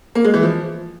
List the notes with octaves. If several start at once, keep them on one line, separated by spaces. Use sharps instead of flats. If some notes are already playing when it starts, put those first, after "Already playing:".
A#3
G#3
E3
F3